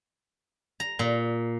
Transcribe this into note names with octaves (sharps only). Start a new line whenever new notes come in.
A#5
A#2